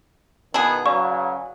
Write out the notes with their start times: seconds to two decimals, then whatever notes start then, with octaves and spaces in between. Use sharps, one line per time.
0.54 B2 D#3 B3 E4 G#4 A5
0.86 C#3 F#3 B4 D5 F5 C#6